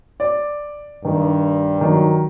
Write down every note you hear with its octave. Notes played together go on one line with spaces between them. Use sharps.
D5
G2 D#3
D#3 F#3